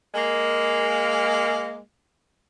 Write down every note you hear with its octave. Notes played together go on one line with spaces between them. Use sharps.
G#3 A#3